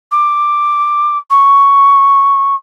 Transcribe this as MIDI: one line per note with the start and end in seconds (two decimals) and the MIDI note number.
0.11 1.18 86
1.30 2.55 85